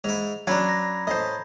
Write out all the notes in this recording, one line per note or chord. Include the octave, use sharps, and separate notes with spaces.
G#2 E4 F7
F#3 C#4 D4 A#5 B5 G#6
A#6
A2 C5 D#5 A5